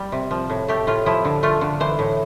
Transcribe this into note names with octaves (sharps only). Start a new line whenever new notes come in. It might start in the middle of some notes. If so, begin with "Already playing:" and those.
Already playing: G3
C3
F3
A2
A3 G4
A2 F4
F3 E4
D3
A3 F4
D3
E3 C5
A2